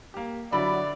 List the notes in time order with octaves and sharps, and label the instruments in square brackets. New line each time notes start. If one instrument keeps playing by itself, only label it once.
[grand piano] A#3 G4
[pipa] B2 B5 [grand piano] D3 E4 [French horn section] F#3 [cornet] D5